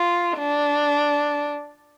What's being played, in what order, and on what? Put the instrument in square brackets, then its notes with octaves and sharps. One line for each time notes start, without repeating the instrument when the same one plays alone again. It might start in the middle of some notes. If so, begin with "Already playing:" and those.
Already playing: [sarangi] F4
D4